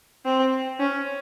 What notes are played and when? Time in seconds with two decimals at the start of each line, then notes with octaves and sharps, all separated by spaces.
0.25 C4
0.80 C#4